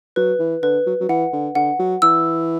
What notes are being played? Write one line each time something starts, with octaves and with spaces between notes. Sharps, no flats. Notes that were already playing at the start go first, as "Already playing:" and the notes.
F#3 B4
E3
D3 B4
F#3
F#3
E3 F#5
D3
D3 F#5
F#3
E3 E6